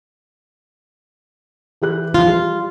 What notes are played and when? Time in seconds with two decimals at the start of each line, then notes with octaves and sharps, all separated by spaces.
1.82 E3 G4 F#6
2.14 E3 F3 F4
2.28 G3